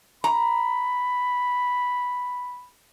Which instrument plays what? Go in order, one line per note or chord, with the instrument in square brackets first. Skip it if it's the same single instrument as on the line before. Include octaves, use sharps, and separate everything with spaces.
[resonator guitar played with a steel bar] A#5 [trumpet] B5